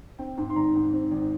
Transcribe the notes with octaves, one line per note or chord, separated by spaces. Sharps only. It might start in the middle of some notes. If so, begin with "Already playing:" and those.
C4 G5
G#2
C6
G#1 A#5
G#2
C4
G#1